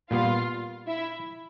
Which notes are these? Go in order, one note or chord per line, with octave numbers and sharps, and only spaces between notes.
A#2 G3 B3 F4 F5
E4 E5